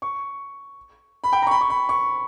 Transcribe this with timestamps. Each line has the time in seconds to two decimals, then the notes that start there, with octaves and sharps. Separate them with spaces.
0.02 C#6
1.24 B5
1.32 G5
1.42 A#5
1.47 C#6
1.51 B5
1.61 C#6
1.70 B5
1.89 C#6